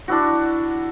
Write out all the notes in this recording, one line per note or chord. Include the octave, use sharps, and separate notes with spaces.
D4 E4 F#4